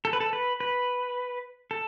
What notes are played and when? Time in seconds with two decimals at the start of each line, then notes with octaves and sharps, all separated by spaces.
0.05 A4
0.13 B4
0.20 A4
0.33 B4
0.60 B4
1.71 A4